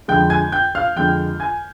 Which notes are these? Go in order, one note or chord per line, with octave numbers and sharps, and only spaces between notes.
F2 D3 G#3 G5 G6
G#5 G#6
G5 G6
F5 F6
F2 D3 G#3 G5 G6
G#5 G#6